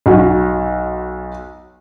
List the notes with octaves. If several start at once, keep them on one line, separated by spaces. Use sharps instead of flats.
B1 F#3